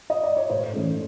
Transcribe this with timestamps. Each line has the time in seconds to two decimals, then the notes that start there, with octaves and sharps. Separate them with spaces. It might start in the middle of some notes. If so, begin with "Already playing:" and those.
0.10 D#5
0.23 D5
0.37 C#5
0.50 A2 C5
0.74 E3 A3 C#4